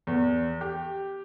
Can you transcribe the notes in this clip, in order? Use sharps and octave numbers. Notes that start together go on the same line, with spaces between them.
E2
G4